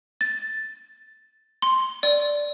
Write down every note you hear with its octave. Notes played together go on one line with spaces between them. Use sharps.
A6
C6
D5